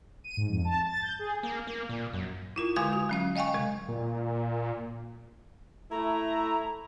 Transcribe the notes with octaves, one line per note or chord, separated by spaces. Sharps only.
D#7
G#2
F2
A5
A6
G6
G#4
A#3
A#3
A#2
F#2
E4 F4 A#4
D3 G#3 G#5 C6 D6 G6
F#4
F#3 C#4 F5
D#5 F5 G5 G#5 C#6
C3 G#3
A#2
A3 E4 A#5